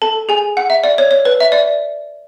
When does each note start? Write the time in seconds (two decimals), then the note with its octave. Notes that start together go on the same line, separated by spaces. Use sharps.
0.02 A4 A5
0.29 G#4 G#5
0.57 F#5
0.70 E5
0.84 D5
0.98 C#5
1.11 C#5
1.25 B4
1.40 E5
1.52 D5